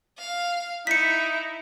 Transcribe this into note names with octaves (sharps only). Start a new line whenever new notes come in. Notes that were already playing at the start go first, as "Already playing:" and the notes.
F5
D#4 E4 B6 C#7